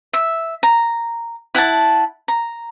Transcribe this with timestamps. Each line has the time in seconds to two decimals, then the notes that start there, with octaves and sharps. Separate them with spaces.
0.13 E5
0.63 A#5
1.55 E4 F#5 G#5 A5
2.28 A#5